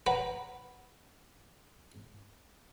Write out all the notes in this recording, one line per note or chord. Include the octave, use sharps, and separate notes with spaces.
B4 F#5 A#5